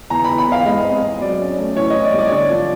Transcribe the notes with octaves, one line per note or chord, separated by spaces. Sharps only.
E2 A#5
E2 B5
B5
E2 F5
G#3 D#5
C4
C4
F#3 D5
C#4
A3
E3 C#5
E3 D#5
D5
G3
D5
D3 C#5
D5
F3